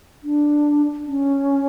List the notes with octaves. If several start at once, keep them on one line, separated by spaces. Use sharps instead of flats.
D4
C#4